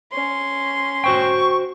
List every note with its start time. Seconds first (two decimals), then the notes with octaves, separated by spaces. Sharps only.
0.12 C#4 C6
1.04 F#4 C5 G5 C#6